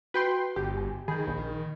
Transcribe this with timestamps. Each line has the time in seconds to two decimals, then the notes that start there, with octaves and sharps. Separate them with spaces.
0.14 F#4 B4 G5 C6
0.56 G1 G4
0.77 G#5
1.08 D#3 G#4 B5 G6
1.27 A#1